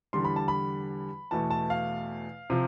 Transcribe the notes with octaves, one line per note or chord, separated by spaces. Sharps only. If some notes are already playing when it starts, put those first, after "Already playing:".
E2 D3 G3 C6
B5
A5
B5
E2 B2 A3 A5
A5
F5
C3 F3